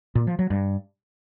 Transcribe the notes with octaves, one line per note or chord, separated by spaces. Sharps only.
A#2
F3
F#3
G2